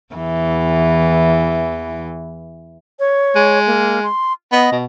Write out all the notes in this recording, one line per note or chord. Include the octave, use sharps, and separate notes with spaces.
E2 E3
C#5
G#3
A#3
C6
B3 D#5
B2